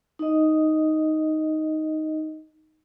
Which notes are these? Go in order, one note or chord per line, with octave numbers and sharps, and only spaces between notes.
D#4 D#5